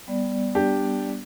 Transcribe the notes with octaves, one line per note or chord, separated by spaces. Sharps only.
G3 B3 D5
D4 G4